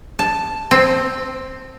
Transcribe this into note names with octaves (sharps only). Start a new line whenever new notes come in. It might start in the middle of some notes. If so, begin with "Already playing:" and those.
A5
C4